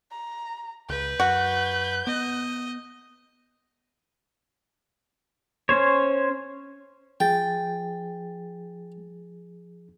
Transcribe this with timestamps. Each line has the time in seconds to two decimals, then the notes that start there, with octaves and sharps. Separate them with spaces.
0.11 A#5
0.90 C#2 B4 G6
1.20 F#2 F#4
2.07 B3 D#5
5.69 C#4 C5 C#5
7.20 F3 G#4 G5 A6